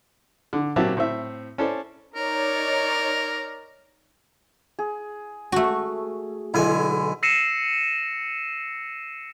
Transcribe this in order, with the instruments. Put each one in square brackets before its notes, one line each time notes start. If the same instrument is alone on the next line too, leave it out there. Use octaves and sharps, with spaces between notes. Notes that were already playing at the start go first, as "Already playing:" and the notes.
[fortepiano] D3
A#2 F#3 C4 G4 E5 A5
A2 C4 E5
C#4 E4 A4 C5 D5
[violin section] D#4 C#5 D5 [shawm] A#4
[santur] G#4
[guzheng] A3 F#4
[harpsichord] B1 D3 G#5 [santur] G#3 E4
[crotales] E6 A#6 C7 C#7 D#7 E7